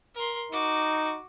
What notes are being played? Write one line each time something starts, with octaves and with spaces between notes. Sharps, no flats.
A#4 C6
D#4 F#4 D6